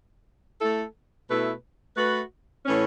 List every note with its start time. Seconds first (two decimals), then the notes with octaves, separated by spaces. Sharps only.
0.59 A3 E4 A4
1.28 B2 A3 E4 B4
1.96 A3 F#4 B4
2.65 A2 E3 C#4